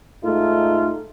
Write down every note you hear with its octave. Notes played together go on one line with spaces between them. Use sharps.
G#2 A3 D#4 F4